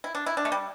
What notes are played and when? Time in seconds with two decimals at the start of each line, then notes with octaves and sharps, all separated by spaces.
0.04 E4
0.15 D4
0.26 E4
0.37 D4
0.45 A3
0.52 G3